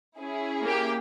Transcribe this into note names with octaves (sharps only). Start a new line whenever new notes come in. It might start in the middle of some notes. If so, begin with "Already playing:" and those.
C#4 E4 G#4
A#3 G4